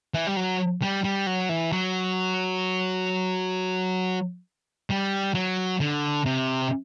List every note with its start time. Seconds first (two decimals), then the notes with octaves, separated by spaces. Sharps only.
0.14 E3
0.27 G3
0.37 F#3
0.82 G3
1.04 G3
1.26 F#3
1.49 E3
1.72 F#3
4.90 G3
5.34 F#3
5.80 D3
6.26 C3